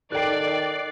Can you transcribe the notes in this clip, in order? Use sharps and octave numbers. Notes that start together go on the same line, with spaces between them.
D#3 A4 D5 G5 F#6 C7